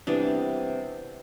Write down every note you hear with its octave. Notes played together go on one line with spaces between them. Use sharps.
C3 E3 G3 B3 D4